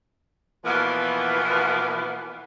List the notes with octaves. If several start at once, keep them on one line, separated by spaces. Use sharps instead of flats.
B2 E3 F3 A#3 B3